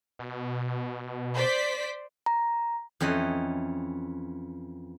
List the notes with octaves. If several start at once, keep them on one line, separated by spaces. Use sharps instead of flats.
B2
C5 D5 B6
A#5
F2 E3 C#4 D#5